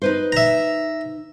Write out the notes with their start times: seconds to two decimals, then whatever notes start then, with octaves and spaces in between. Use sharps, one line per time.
0.02 D#4 B4 C5
0.32 E5 A#5